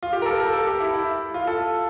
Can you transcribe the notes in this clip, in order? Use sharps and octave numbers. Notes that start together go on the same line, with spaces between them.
F4
G4
A#4
A4
A#4
A4
G4
E4
E4
F4
A4